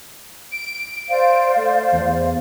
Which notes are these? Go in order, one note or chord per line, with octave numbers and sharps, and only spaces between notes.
D7
C5 D5 F5
A3
E2